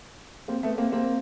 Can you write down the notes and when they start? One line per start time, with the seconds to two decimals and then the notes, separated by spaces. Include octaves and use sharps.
0.48 A#3 C4
0.63 A3 B3
0.78 A#3 C4
0.92 A#3 C4